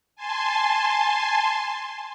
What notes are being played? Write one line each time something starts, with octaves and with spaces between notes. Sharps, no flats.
G#5 A5 C6